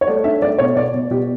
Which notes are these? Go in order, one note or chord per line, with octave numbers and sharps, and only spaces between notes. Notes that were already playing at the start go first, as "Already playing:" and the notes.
C#5
A3 D5
D4 E5
A3 D5
B2 C#5
B2 D5
B2
B2 G4